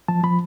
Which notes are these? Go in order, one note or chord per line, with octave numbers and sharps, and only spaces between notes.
F3 A5
F3 B5